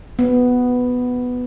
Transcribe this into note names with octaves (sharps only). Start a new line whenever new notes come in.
B3